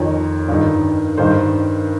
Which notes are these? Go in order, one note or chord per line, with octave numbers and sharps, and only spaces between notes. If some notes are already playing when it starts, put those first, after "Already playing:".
Already playing: F2 D#3 C#5
G2 D#3
G2 D#3 C5